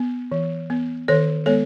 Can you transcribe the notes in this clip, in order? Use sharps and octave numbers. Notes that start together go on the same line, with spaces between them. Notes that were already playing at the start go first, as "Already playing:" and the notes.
Already playing: B3
E3
B3
D#3 A4 C#5
G#3 B3 A4 C#5